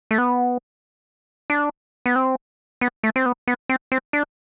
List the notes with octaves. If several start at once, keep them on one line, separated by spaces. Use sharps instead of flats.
A3
B3
D4
B3
C4
B3
A3
C4
B3
B3
C4
C4
D4